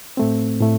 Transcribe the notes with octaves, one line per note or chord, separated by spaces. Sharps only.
A2 A3 C4
A2 A3